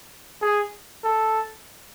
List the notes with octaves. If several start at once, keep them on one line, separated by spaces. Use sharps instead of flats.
G#4
A4